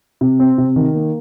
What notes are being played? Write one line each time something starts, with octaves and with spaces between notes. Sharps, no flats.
C3
C4
C3
D#3
A#3